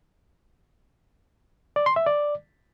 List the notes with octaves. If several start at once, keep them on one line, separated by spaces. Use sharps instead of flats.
D5
C6
E5
D5